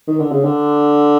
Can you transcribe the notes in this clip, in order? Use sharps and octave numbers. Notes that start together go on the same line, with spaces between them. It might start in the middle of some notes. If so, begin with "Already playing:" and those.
D#3
D3
C#3
D3